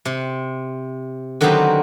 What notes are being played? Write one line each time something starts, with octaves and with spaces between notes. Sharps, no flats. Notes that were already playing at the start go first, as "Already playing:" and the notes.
C3
D3 D#3 F#3 B3 C4 G4